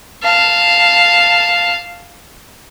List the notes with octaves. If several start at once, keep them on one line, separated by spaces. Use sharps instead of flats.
F5 A5